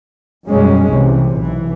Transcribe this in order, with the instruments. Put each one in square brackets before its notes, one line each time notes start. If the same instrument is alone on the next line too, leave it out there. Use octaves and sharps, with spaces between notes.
[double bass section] F#2 B2 G3 G#3 C#4
C2 C3 E3
B1 E3